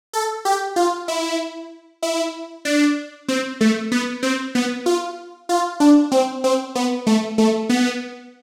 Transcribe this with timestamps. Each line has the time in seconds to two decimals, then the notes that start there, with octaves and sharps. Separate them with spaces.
0.13 A4
0.45 G4
0.76 F4
1.08 E4
2.03 E4
2.65 D4
3.28 C4
3.61 A3
3.92 B3
4.23 C4
4.55 B3
4.86 F4
5.49 F4
5.80 D4
6.12 C4
6.44 C4
6.75 B3
7.07 A3
7.38 A3
7.69 B3